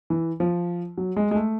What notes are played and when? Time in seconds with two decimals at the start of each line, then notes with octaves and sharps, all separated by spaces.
0.10 E3
0.40 F3
0.98 F#3
1.16 G#3
1.31 G#3
1.35 A3